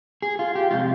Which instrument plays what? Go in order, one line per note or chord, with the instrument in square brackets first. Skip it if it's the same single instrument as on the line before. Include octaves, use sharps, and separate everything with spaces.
[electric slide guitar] G#4
F4
G4
C3 F3 G#3 F4